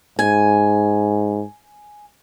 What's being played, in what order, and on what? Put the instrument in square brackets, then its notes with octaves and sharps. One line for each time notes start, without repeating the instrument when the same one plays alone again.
[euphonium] G#2 [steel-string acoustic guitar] G#5